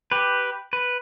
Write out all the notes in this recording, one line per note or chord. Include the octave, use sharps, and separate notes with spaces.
G4 B4
B4